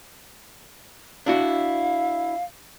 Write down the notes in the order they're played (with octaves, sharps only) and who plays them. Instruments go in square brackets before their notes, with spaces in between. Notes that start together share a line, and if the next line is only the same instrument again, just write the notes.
[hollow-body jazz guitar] D4 E4 F#4 [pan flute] F5